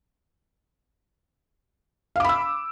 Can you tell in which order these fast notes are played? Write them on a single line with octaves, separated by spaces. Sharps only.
F5 D6 B5 E6